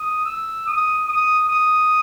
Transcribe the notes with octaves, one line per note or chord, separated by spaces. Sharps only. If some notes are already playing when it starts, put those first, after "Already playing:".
Already playing: D#6
E6
D#6
D#6
D#6